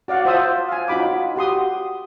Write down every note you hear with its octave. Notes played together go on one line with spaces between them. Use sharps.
F#4 D5 F5 F#5
F4 C5 E5 A5 D#6 E6
F5 G#5
D#4 F4 F#4 B5 D6
F#4 G4 C6 D#6